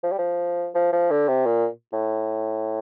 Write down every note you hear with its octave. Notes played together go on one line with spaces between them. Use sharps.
F3
G3
F3
F3
F3
D3
C3
A#2
A2